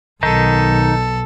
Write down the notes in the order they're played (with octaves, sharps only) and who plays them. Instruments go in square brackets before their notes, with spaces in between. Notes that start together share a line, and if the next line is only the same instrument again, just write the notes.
[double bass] B1 [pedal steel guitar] D#3 D#4 [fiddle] A4